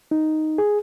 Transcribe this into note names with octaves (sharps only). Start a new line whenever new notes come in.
D#4
G#4